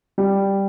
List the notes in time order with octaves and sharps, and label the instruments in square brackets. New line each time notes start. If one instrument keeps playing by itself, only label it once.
[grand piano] G3